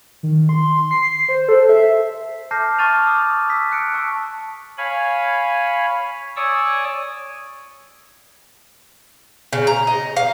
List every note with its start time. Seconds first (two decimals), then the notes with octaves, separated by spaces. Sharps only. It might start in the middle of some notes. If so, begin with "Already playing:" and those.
0.23 D#3
0.49 C6
0.91 C7
1.29 C5
1.49 A4
1.69 E5
2.51 A5 D6 F6 G6 A#6 C7
2.79 A5 C#6 F6 A6 D#7 F7
3.06 D6 D#6
3.49 D#6 E6 B6
3.71 F#6 C#7 D7
3.94 A5 C#6 E6
4.78 C#5 F5 G#5 B5
6.36 C#5 D5 G#5 C#6 D#6 E6
9.53 C#3
9.67 A#5
9.87 D#5
10.16 F5